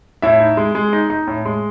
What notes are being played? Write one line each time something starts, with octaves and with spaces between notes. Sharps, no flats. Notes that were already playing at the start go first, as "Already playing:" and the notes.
A2 E4 E5
D#4
G#3
G#3
D#4
D#4
A2
G#3